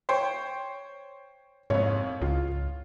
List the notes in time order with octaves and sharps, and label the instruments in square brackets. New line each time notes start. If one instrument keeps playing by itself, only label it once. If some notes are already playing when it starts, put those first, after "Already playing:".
[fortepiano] C5 C#5 G5
[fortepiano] C2 F2 [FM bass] G#2 [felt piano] C#5
[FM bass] C#2 [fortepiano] F4